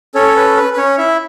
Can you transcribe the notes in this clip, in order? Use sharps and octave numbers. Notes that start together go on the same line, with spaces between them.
C#4 A4 C#5
B4
B4
B4
C#4 C#5
E4 E5